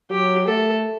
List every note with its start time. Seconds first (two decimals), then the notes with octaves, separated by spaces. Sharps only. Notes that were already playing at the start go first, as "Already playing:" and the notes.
0.10 F#3 G4
0.47 A3 A4